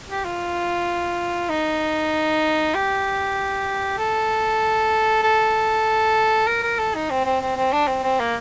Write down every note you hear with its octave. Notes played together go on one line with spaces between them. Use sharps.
G4
F4
D#4
G4
A4
A4
A#4
A#4
A4
D#4
C4
C4
C4
C4
D4
C4
C4
A#3